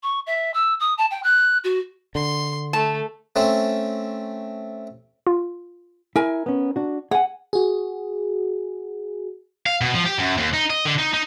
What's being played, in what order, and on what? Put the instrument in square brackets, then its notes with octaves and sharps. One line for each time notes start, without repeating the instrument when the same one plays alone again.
[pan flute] C#6
E5
E6
D#6
A5
G5
F#6
F#4
[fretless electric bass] D3 [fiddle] C6
[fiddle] A3 [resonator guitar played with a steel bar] A5
[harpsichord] A3 C4 C#4
[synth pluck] F4
[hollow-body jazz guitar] E4 [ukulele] A#4 G#5
[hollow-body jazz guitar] B3 C#4
D4 F#4
[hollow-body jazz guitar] G#4 G#5 [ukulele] F#5
[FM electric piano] F#4 G#4
[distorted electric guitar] F5
B2
F3
G4
F#2
D#2
D#4
D#5
D3
D#4
D#4